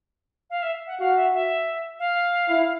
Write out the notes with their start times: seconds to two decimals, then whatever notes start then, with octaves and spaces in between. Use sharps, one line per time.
0.50 F5
0.62 E5
0.87 F#5
1.00 F#4 F5
1.16 E5
1.33 E5
1.99 F5
2.49 E4